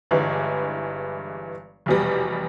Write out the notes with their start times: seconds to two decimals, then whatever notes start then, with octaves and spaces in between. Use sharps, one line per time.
0.11 G1 G2 E3 G#3
1.86 F1 E2 B2 G3